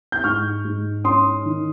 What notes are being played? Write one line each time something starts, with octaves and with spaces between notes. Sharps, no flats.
G6
G#2 C#6 F6
G#2
C#4 C6 D#6
D#3